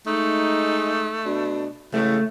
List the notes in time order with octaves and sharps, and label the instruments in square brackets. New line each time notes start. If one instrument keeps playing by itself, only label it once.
[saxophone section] G#3 D#4 [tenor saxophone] A3
[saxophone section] B2 D4
[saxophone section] A2 E3 G#3 [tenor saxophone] C#3 [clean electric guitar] A3